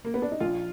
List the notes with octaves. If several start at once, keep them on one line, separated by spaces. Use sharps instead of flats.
A#3
B3
D4
D#4
A#1 F4